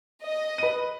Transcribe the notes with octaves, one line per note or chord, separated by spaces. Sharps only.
D#5
B4 D#7